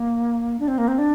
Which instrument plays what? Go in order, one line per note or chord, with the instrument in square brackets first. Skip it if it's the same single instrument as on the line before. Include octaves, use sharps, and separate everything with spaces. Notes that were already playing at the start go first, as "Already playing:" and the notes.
Already playing: [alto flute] A#3
D4
C4
A#3
C4
D4